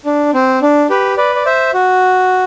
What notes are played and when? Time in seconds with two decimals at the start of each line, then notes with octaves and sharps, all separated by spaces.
0.05 D4
0.34 C4
0.62 D4
0.90 G4 B4
1.18 B4 D5
1.35 D5
1.46 C5 E5
1.74 F#4